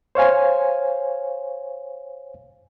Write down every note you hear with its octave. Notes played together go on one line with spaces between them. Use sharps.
C5 C#5 F5 G#5